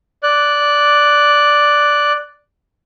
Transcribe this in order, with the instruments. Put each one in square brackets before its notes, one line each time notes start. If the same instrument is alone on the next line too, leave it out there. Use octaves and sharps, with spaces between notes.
[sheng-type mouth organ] D5 F#6